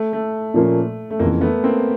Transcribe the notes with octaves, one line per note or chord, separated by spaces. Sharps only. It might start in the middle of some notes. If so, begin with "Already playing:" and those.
Already playing: A3
A3
A#2 F3 A#3 C#4
A3
F2 C#3 E3 A#3
A3 B3
A#3 C4